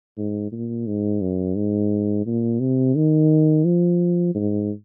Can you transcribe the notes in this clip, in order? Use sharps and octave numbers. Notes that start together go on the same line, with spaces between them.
G#2
A#2
G#2
F#2
G#2
A#2
C3
D#3
F3
G#2